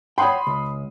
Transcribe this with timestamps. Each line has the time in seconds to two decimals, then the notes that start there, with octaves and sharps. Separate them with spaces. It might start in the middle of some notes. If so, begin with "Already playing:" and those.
0.18 C#5 F#5 G5 B5 C6 D#6
0.47 C#2